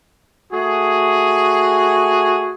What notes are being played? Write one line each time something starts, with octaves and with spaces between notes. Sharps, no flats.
A3 F#4 G#4